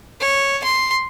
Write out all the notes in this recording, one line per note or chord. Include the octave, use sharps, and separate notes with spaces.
C#5
C6